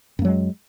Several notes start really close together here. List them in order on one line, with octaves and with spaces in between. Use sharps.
F#2 A#3 F#3 G#3